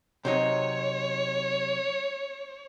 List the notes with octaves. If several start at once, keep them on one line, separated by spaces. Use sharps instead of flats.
C3 F#3 D#4 C#5